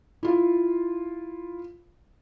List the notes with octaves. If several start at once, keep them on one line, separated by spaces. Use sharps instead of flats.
E4 F4